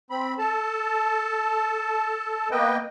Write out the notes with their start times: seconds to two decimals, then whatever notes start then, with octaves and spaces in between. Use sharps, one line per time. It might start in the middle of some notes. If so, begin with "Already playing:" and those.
0.11 C4 B5
0.39 A4 A5
2.51 A#3 B3 B4 D#5 G5